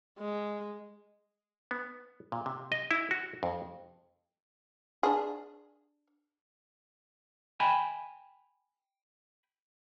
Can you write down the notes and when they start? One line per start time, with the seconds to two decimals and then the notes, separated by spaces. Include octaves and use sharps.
0.18 G#3
1.71 B3
2.32 A#2
2.46 C3
2.72 D#5
2.91 E4
3.11 F#4
3.43 F2
5.03 D4 G#4
7.60 G5 G#5 B5